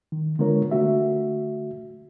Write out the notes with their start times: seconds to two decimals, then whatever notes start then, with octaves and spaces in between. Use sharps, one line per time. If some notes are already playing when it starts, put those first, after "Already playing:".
0.12 D#3
0.39 D3 G#3 B3 F4 A#4 C#5
0.71 D3 A3 F#4 E5